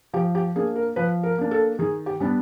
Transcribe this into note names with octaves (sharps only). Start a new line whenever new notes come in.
F3 G4
G4
A#3 D4 G#4
A#4
F3 B4
A#4
A#3 D4
A4
D#3 G#4
G4
G3 B3 D4